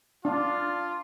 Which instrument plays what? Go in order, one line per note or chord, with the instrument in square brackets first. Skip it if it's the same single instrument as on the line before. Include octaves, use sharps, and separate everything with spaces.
[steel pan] D4 [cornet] F4